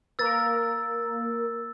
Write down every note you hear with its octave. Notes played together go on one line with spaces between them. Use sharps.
A#3 A#4 E6 A6